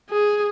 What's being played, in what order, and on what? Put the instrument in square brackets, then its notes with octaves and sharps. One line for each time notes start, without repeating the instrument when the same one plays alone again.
[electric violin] G#4